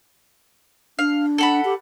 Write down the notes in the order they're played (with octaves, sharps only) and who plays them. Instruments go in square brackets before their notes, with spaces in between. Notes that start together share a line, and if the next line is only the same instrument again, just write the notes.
[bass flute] D4 [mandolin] F5
[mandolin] A4 F#5 B5
[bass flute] G4